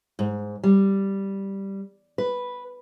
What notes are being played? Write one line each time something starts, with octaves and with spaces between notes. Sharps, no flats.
G#2
G3
B4